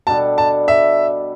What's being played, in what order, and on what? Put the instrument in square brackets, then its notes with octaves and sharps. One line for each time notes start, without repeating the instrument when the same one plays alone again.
[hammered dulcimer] B2 G3 D4 A4 [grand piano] A5
[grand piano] A5
E5